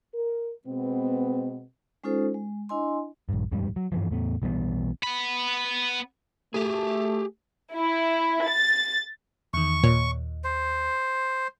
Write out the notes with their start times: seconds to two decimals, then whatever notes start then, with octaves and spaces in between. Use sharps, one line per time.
0.14 A#4
0.67 B2 G#3 B3 C4
2.04 G#3 C#4 D#4 F4 A4 C5
2.34 G#3
2.69 D4 E4 D#5 G#5 C6
3.29 A#1 G2
3.51 D#1 F2 G#2 G3
3.76 F#3
3.92 G2 E3 F3
4.11 E2 A2 A3 B3
4.42 B1 E3 G3 B3
5.04 B3 B5
6.54 A3 G4 G#4
7.76 E4
8.47 A6
9.54 E2 D#3 C#6
9.83 D#2 A#2 C#5
10.44 C5